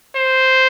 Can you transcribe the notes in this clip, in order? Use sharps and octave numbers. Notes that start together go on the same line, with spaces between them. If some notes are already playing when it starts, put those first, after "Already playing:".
C5